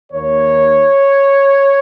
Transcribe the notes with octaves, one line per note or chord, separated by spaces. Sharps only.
D#2 D#3 A#3 C#5